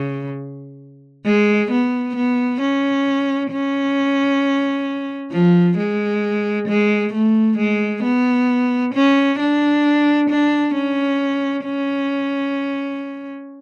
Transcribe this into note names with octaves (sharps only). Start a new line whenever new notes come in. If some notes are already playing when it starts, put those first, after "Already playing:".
Already playing: C#3
G#3
B3
B3
C#4
C#4
F3
G#3
G#3
A3
G#3
B3
C#4
D4
D4
C#4
C#4